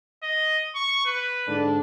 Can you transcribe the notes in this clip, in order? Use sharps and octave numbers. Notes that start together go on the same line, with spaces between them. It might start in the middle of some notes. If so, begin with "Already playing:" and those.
D#5
C#6
B4
G#2 D3 D4